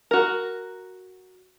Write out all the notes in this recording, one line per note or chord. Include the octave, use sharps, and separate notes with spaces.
F#4 A#4